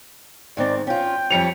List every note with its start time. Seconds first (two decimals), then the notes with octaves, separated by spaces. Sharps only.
0.57 G#2 D#3 C4 D5
0.87 C#4 F4 G5
1.30 F2 G3 C#5 C#7 F7